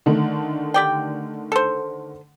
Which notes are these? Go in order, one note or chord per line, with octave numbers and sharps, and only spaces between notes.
D3 D#3 A3
G4 D5 G5
A4 C5